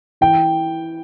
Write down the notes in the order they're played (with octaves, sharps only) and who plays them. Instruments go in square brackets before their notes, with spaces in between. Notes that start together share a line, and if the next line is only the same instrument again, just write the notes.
[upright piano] E3 G5